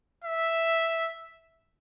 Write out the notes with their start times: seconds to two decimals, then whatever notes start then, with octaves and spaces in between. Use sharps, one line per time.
0.24 E5